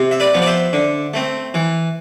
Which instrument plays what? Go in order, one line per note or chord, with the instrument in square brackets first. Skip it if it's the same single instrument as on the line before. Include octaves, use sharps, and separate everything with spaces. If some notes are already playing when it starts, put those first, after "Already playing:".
Already playing: [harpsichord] C3
E5
B4 D5
F3 B3
D5
C5 E5
D3
A3 C4
E3